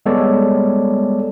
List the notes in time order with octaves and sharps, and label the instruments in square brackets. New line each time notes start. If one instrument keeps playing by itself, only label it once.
[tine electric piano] G3 G#3 B3 A4 C#5 D5